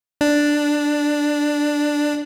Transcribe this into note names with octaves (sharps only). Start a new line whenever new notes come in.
D4